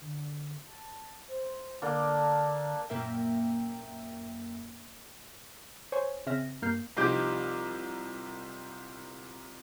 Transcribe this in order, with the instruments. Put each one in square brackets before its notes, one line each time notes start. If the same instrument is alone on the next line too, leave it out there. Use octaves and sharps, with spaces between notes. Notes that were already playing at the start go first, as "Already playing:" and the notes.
[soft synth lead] D3
A5
C5
[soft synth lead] D3 [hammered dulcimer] A#3 D4 A4
[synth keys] F#2 A#2 A#3 A#4 E5 G5
[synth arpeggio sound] C5 C#5 G#5
C#3 C4 E5 F6 A#6
G2 A#3 F6 G6 C7
[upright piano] C2 F3 D#4 G4 D6 G6